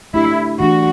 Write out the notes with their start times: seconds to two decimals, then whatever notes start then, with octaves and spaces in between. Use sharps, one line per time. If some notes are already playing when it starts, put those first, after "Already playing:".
0.14 A3 D4 E4 G4
0.60 E3 A3 D4 F#4